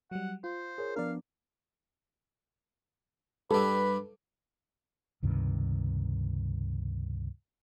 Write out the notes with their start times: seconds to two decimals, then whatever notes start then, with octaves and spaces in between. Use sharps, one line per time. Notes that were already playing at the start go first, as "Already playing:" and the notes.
0.11 F#3 G3 F#5
0.44 F4 C5
0.78 G#4 A#4 C#5
0.96 F3 B3 D4 A#4 D5 F5
3.51 G2 G3 A4 B4
5.23 C#2 G2 C3 D#3